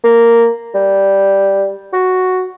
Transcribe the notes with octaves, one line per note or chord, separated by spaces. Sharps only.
A#3
G3
F#4